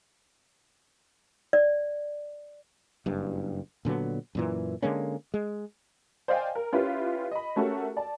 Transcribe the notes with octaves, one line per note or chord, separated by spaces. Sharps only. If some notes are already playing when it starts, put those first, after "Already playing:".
D5
F#1 G2
A#2 D3 F#3 B3
F#2 A#2 E3
D3 G#3 A#3 C#4
G#3
C5 D5 D#5 F5 G5 G#5
A#4
C#4 E4 F4 G4 B4
D#5 B5
A3 C#4 F#4 G4 A4 A#4
D5 A5